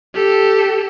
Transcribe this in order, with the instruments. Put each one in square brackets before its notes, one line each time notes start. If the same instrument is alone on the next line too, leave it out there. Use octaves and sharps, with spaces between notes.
[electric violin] G4 A4